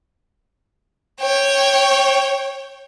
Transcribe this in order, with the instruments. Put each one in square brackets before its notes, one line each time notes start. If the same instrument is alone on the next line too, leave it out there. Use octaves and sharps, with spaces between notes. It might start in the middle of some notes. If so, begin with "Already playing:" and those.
[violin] C#5 G5